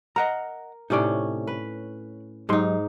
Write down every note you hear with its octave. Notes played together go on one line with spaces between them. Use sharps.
A#4 D#5 F#5 A#5
A2 C3 C#4 D#4 D5
B4
G#2 F#3 D#4 G4 C6